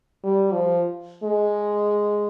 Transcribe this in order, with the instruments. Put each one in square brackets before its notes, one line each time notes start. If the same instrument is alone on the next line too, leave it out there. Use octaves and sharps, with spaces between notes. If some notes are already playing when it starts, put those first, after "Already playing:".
[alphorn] G3
F3
G#3